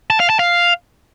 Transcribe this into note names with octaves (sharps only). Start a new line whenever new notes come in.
A5
F5
A5
F5